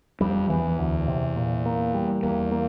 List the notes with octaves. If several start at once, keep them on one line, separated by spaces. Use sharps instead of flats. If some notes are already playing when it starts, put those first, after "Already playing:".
F2 G3
E2 E3
D2
C3
A#2
A#3
G3
E2 A#3
A#3